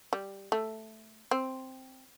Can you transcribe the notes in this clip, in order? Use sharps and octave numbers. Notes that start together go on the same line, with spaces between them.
G3
A3
C4